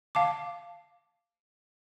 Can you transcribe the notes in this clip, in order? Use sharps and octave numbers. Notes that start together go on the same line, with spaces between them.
F5 A5 D6